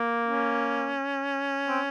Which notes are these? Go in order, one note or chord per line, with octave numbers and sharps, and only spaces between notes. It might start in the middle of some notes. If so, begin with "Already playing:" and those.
Already playing: A#3
C#4
C4